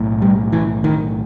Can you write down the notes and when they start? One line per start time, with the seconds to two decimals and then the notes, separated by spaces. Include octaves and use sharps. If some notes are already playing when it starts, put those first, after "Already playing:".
Already playing: B1 A2
0.22 G3
0.53 E3
0.84 D#3